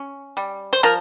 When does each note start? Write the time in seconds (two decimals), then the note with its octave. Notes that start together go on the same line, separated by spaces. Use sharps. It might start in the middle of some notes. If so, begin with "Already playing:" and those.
Already playing: C#4
0.37 G3
0.73 C5
0.83 F3 A#4